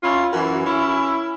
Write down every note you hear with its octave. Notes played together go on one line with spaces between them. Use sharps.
C#4 E4 F4
F#2 E3
C#4 E4